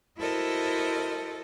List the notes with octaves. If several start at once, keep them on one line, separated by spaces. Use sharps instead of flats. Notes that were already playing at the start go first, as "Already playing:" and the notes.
E4 F#4 A4 A#4 C5 D#5